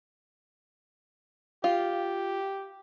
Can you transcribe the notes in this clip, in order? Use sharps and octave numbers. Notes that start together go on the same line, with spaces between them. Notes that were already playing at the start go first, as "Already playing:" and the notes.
F4 G4